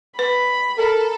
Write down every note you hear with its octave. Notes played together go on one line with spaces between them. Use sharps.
B4 B5
A4 A#4